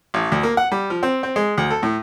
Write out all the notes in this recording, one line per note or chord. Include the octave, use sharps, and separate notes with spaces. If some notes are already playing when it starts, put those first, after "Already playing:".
A1
D2
A#3
F#5
G3
F3
C4
C4
G#3
D2
A4
A2